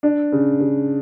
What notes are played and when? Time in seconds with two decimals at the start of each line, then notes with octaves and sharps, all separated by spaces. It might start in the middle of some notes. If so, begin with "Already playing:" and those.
0.03 D4
0.32 C#3
0.60 C#3